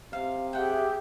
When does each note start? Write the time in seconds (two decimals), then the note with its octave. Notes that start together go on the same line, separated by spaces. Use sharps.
0.13 C3 F5
0.53 G4 G#4 E5 F#5 G5